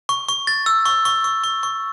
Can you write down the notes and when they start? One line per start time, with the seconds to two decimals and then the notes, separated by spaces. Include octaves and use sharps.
0.09 C#6
0.29 C#6
0.47 A6
0.66 E6
0.86 C#6
1.05 C#6
1.24 C#6
1.44 C#6
1.63 C#6